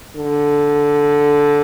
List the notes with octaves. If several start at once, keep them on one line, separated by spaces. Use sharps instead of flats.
D3